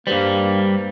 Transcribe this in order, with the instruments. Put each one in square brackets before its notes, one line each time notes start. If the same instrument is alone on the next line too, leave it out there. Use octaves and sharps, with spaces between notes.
[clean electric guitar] G2 G3 [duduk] A#3 [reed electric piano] G4 B4 C5